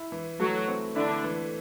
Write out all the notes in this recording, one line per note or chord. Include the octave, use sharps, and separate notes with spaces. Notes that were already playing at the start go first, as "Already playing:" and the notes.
Already playing: E4
E3
F#3 A3 F#4
C4
D3 D4 E4
E3